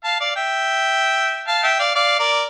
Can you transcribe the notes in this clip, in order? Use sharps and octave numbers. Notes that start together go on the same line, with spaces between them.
F5 A5
D5 F5
E5 G5
F5 A5
E5 G5
D5 F5
D5 F5
A#4 D5